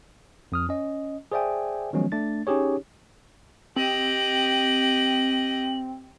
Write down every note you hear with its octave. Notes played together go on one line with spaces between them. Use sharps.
F2 D#6 F6
C#4 D#5
G#4 C5 D5 E5 G5 G#5
D#3 F3 F#3 G#3 B3 C#4
A3 D4 A6
C#4 D#4 G4 G#4 C#5
C4 G4 D#5 F#7